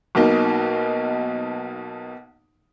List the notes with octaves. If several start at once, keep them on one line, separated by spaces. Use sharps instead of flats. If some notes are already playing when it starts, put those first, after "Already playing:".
B1 B2 A#3 D#4